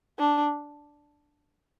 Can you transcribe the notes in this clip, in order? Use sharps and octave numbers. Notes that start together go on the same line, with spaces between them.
D4